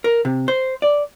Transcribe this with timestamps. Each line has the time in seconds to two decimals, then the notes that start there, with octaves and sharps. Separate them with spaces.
0.04 A#4
0.25 C3
0.48 C5
0.82 D5